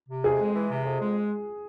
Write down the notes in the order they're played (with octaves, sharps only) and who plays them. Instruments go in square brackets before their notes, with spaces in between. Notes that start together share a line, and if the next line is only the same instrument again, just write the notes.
[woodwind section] C3
[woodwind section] F2 [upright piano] G#4
[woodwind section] G#3
E3
C3
F2
G#3